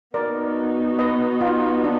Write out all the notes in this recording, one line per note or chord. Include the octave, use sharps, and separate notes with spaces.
B3 D#4 F#4 A#4 D5
B4 D#5
F4
D4